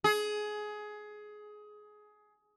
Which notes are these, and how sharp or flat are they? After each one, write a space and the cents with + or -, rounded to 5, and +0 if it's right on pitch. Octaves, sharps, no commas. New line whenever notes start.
G#4 +20